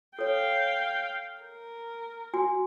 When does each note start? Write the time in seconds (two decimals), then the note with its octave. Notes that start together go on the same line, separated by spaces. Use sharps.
0.19 A4 C#5 F5 G5
1.43 A#4
2.34 F#4 G#5 C6